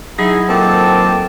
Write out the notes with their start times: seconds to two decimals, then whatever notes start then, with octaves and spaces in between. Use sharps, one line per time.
0.19 F#3 D#4 E4 G#4
0.50 A#2 D#3 C4 A4 G5 A5 D6